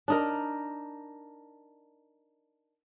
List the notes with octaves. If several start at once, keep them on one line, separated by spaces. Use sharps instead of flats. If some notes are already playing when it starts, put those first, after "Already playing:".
D4 D#4 A#4